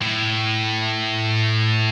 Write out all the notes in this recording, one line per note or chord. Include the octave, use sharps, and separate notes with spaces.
A2